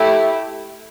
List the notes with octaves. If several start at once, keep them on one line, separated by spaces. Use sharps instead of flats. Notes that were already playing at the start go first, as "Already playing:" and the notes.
Already playing: A3 E4 G4